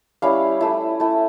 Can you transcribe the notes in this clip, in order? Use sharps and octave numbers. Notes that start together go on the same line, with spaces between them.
G3 C#4 E4 F5
A3 E4
A3 E4